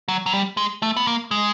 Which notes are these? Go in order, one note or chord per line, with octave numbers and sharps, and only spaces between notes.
F#3
F#3
G3
G#3
A3
B3
A#3
G#3